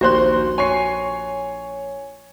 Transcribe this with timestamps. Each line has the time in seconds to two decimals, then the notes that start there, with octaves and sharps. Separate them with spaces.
0.01 A#1 D#2 F#4 C5 C6 F#6
0.58 C#5 G#5 C#6 C7